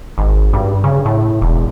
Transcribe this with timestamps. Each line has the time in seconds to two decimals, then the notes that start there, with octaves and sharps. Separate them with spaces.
0.18 G#1
0.53 G2
0.84 C#3
1.06 A2
1.42 E1